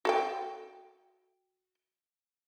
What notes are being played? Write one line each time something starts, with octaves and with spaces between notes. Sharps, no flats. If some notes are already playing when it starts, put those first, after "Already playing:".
F#4 A4 G5